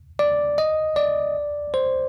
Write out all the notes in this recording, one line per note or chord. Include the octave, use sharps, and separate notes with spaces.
D5
D#5
D5
C5